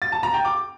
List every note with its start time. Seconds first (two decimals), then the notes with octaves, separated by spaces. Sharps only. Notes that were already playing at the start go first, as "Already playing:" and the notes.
0.02 A6
0.12 A5
0.23 A#5
0.34 G5
0.45 D6